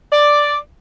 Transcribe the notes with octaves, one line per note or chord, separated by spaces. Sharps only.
D5